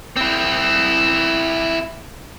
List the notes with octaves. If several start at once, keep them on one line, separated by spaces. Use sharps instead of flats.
C4 E4